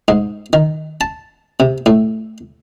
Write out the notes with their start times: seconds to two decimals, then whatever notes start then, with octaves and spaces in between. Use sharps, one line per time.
0.08 G#2
0.53 D#3
1.01 A5
1.60 C3
1.86 A2